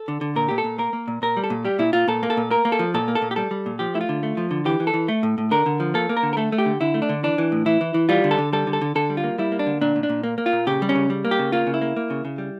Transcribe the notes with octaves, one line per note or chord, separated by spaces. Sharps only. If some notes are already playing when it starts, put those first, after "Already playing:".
Already playing: A4
D3
D3
A#2 A#4
A#2 G4
A4
A#2
A#3 A#4
A#3
A#2
A#2 A#4
G3
A4
A#2
G3 G4
A#2 E4
A#2 F4
A#2 A4
A#3
A4
A#2
A#3 A#4
A#3
A4
F3
A#2 A4
A#3
A4
A#2
G4
G3 A4
G3
A#2
F3 G4
A3 E4
F4
D3
A3
F3
D3
E3 G4
E3
A4
E3
A3
A2
A2
D3 A#4
D3
F3
A#3 A4
A#3
A#4
D3
A#4
A3 A4
A3
G4
D3
D3 E4
A3
D4
D3
E3 D4
E3
A2
E3 E4
E3
E3
G3 F4
D3
A4
D3
G3 A4
D3
A4
D3
D3 A4
G3
F4
A#3
G3 E4
A#3
D4
D3
A#2 D4
A#2
D4
A#2
A#3
A#3
F4
A#2
C#3 G4
G3
C#4
C#3
G3
A#3
G4
C#3
A#3 F4
C#3
E4
A#3
A#3
C#3
C#3
G3